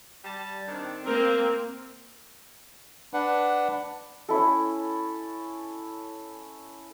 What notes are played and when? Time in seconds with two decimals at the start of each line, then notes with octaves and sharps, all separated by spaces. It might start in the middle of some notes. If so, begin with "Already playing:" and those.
0.24 G3 A5
0.68 D#3 C4 D4
1.06 A#3 C4 A#4
3.14 D4 B4 F#5
4.29 C#4 E4 A4